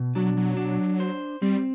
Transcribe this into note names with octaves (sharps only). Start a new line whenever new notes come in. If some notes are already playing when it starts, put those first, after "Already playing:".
Already playing: B2
F#3 D4
F#3
D4
C5
G3 C4